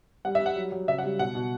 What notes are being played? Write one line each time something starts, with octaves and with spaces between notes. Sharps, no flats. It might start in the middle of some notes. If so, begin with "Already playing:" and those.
G3 F#5
E5
G3
F#5
F#3
F#3
C#3 E5
F#5
G3
B2 F#5
B2